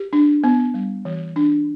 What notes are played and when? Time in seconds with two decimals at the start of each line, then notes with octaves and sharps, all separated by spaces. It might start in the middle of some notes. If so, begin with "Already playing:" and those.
Already playing: G4
0.13 D4
0.44 B3
0.74 G3
1.05 E3
1.36 D4